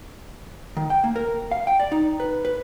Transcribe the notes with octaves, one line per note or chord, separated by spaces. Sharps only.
D#3
G5
A#3
A#4
F5
G5
D5
D#4
B4
B4